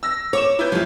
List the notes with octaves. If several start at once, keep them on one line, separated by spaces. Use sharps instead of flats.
E6 A#6
C#5 D6 E7
E4 B4 G6
F#1 F3 G3